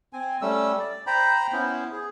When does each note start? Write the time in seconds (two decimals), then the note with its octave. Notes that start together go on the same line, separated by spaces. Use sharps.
0.13 C4 G#5
0.41 G3 A3 C#4 E6
0.80 D5
1.07 C5 G5 A#5 B5
1.53 B3 C#4 E4 C5
1.92 G#4